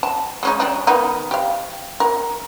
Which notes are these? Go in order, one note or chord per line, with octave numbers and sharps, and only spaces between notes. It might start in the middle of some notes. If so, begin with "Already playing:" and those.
A5
G#3 C#4 D#4
G3 D4
D#3 B3 D#4
G4 F5
A#4